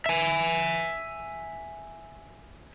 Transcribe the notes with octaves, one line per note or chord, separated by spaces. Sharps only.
E5 G#5